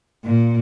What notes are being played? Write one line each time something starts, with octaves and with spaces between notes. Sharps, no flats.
A#2